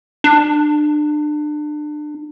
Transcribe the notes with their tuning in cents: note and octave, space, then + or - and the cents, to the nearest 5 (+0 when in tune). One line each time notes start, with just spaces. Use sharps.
D4 +30